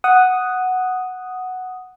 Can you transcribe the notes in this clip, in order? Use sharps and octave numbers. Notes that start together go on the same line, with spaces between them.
F#5 D#6